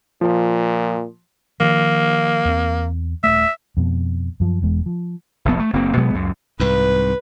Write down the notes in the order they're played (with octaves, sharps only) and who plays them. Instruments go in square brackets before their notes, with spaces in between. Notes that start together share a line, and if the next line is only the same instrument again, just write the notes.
[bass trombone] A#2 [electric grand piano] F3
[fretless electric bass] D#3 F3 [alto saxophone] A#3
[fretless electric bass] E2 C4
[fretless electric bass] D#1 A3 [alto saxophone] E5
[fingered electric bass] F2 B2
F#2 F3
E1 E2 G#3
F3
[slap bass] F1 A#1 B3
A3
F#1 A#3 C4
B2 F#3 G#3 B3
C#2 F#2
[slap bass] C2 G#2 [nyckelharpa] B4